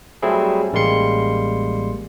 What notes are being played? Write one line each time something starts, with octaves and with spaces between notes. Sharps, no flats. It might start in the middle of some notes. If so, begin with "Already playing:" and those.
F#3 G3 A3 C4 E4 G#4
A1 G3 G#3 A#3 C6 C#7